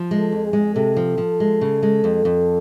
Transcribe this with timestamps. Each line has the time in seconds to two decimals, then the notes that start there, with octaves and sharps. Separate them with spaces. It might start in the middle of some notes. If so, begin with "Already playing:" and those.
Already playing: F3
0.11 G#3
0.18 A4
0.32 F2
0.47 G#4
0.53 G#3
0.75 C3 A4
0.97 F3
1.18 F3
1.40 G#3
1.61 C#3
1.83 G#3
2.04 F2
2.25 F2